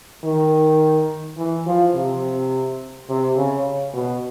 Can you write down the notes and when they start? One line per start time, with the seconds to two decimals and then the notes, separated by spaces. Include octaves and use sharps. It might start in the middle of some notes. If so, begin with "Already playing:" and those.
0.24 D#3
1.38 E3
1.66 F3
1.95 C3
3.09 C3
3.37 C#3
3.94 B2